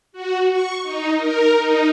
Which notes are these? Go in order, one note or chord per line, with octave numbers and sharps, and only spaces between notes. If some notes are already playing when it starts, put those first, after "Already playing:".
F#4
C#6
D#4
A#4
D#4